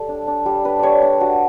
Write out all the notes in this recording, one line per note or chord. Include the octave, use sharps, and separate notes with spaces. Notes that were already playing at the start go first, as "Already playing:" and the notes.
Already playing: G3 A4
D4
D4
G3
D4 B4
G3 C#5 D5
D4
D4 F#4